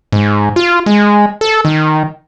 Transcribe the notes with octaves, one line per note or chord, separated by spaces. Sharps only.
G#2
F4
G#3
A4
D#3